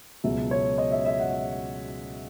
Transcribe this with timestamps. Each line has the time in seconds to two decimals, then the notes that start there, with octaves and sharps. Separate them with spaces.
0.24 C#2 B2 F#3 E5
0.51 C#5
0.78 D#5
0.91 E5
1.05 E5
1.19 F#5